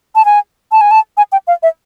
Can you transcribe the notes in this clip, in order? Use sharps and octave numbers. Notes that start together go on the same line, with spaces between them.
A5
G#5
A5
G#5
A5
G#5
G5
F5
E5